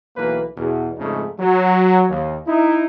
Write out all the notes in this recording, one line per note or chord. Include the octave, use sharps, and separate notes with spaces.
B1 E3 A#3 B4
E2 B2
F2 G#2 C#3 A3 D#4
F#3
D#2
D#4 E4